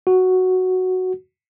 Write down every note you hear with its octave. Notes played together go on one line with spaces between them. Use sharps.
F#4